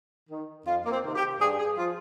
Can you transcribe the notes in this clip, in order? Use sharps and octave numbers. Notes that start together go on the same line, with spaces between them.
D#3
F2 F4
A#3
C4
C3 D#3
G4
G2 G#4
G#4
F3 F4